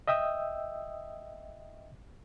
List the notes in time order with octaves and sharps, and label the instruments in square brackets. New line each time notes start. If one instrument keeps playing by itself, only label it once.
[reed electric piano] D#5 E5 G5 D#6 E6